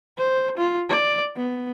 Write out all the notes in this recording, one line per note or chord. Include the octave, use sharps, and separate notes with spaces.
C5
F4
D5
B3